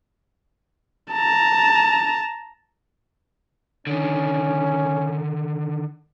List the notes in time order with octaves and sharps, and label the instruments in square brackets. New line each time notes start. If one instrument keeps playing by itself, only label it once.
[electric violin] A5 A#5
[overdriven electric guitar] D3 D#3 [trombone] C#4